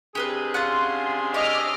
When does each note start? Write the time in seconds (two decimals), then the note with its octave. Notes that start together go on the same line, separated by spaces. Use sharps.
0.15 C3 D4 G4 G#4 A#4 B4
0.54 C#4 F4 F#5 C6
1.34 C#5 D#5 E5 D6 F6